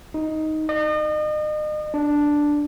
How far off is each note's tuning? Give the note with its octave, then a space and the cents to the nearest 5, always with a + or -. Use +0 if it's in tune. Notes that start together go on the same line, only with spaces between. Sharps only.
D#4 +5
D#5 -35
D4 +0